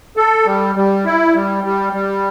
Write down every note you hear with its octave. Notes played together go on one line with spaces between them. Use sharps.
A4
G3
G3
E4
G3
G3
G3